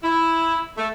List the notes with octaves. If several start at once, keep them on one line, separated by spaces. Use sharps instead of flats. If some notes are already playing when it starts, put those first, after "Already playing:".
E4
A3